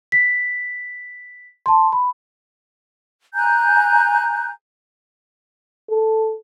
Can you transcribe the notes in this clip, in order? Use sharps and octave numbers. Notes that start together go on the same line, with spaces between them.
B6
A5 C6
B5
G#5 A#5 F#6 G6
A4